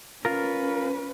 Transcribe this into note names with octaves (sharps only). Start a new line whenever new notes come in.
C#4 F4 A#4 B4